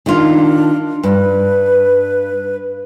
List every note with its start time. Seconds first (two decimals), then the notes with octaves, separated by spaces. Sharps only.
0.06 D#3 D4 F4
1.03 G2 B4